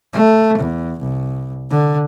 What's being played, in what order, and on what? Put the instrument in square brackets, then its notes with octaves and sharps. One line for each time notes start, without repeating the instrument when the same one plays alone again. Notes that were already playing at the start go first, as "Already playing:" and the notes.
[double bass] A3
E2
C2
D3